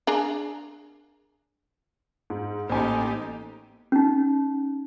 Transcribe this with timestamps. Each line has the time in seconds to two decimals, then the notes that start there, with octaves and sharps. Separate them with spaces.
0.07 D4 G#4 A#4
2.30 G#2
2.70 A1 A#3 B3 D#4 G4 A4 C5 G#5
3.92 C#4 D#4